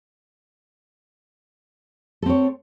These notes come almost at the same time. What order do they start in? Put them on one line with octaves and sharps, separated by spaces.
A4 C4 C#5